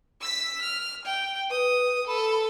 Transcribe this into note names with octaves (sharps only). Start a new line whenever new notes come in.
E6 B6
F6
G5
B4 D#6
A4 B5